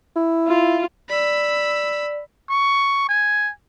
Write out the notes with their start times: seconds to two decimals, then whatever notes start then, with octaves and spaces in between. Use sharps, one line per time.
0.16 E4
0.48 F4
1.09 D5 B5 E6
2.49 C#6
3.09 G#5